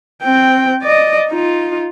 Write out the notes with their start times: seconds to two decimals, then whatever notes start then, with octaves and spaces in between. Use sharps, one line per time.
0.23 C4 G5
0.83 D5 D#5
1.28 D#4 F4